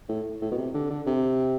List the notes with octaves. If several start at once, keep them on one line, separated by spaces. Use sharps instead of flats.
A2
A2
B2
C3
D3
D3
C3